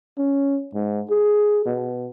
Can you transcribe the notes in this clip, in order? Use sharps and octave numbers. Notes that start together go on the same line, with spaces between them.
C#4
G#2
G#4
B2